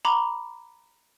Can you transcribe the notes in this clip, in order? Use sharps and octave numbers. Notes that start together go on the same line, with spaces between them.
A#5 B5 D6